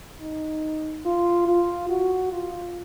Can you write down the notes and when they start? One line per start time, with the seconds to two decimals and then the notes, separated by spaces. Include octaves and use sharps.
0.21 D#4
1.06 F4
1.47 F4
1.89 F#4
2.32 F4